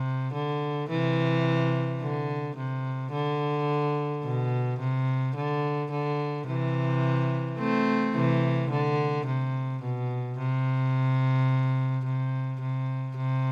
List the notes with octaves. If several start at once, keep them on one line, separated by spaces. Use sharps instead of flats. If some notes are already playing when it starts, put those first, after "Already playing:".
Already playing: C3
D3
C3 E3
D3
C3
D3
B2
C3
D3
D3
C3 E3
A3 C4
C3 E3
D3
C3
B2
C3
C3
C3
C3